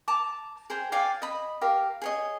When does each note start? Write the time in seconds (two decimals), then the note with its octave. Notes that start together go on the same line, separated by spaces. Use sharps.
0.08 A5 A#5 D6
0.70 G#4 A#4 C5 G5
0.92 D5 F5 G5 G#5
1.22 D#5 B5
1.61 G4 A#4 F5
2.02 G#4 C#5 D#5